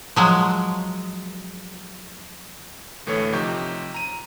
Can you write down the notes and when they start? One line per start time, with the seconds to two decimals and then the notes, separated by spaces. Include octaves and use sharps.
0.16 F3 F#3 G#3
3.07 D2 A2 E3 A3 C#5
3.33 C3 F3 D#4 G4 C#6 G6
3.94 A#5 D#7